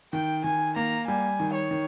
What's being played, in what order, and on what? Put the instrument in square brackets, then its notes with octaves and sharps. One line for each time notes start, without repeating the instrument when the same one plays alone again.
[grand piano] D#3 [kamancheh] G5
[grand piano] D#3 [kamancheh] G#5
[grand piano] A#3 [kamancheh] A#5
[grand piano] G3 [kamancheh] G#5
[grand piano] D#3
[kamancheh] C#5
[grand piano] D#3